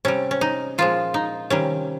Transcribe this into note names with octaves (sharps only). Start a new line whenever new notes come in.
C3 G3 C#4
C#4
D#4
A#2 F3 G#3 F4
D#4
C3 D#3 G3 C#4